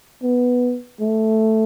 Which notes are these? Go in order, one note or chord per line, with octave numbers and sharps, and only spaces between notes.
B3
A3